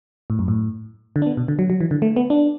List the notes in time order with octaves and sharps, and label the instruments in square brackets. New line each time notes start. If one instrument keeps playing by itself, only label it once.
[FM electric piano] A2
F#2
A2
D3
D4
B3
B2
D3
F#3
F#3
E3
D3
A3
B3
D4